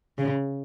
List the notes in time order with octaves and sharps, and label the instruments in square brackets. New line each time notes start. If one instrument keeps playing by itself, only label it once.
[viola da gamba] C#3